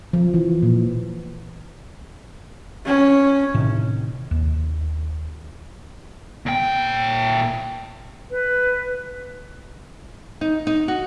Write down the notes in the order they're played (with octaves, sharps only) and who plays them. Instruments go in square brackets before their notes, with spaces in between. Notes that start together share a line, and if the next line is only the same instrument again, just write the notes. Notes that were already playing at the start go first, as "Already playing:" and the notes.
[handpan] F3
E3
A#2
[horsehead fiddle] C#4
[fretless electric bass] A2 C3 D#3
D#2
[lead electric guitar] A#2 G5
[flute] B4
[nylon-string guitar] D#4
D#4
F#4